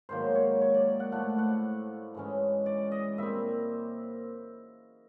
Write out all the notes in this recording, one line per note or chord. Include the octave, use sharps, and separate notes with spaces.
G#2 D#3 F#3 A#3 C5
C#5
C#5
D5
F#5
A2 F3 A3 F#5
F#5
G#2 E3 G#3 C#4
D5
D#5
A#2 G3 C4 E5